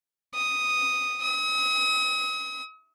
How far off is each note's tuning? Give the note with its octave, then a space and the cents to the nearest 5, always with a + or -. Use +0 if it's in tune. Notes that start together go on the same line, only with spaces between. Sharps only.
D#6 +0
D#6 +40